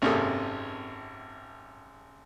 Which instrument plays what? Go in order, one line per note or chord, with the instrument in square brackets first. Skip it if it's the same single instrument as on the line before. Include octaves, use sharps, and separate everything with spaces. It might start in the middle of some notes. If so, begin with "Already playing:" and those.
[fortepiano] G#1 F#2 C3 A#3 A4 D#6